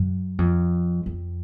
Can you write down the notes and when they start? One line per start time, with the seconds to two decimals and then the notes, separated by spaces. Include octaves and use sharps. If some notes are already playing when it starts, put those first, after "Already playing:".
Already playing: F#2
0.38 F2
1.06 F2